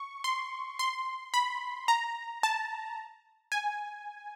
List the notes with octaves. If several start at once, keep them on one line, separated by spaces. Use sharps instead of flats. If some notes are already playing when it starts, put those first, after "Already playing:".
Already playing: C#6
C6
C6
B5
A#5
A5
G#5